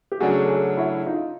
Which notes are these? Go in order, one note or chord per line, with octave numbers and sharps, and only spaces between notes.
G4
C#3 F#3 A3 D4 F#4 G#4
A4
F#4 G#4
E4 F#4
D#4 F4